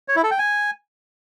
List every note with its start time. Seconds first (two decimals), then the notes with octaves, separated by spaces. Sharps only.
0.08 C#5
0.16 E4
0.24 A4
0.31 G5
0.39 G#5